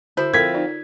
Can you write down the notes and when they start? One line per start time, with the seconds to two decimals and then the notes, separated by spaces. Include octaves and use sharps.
0.17 D3 E4 F#4 C5
0.34 F3 C4 A4 A#4 G#6 B6
0.54 D#4 F4 D5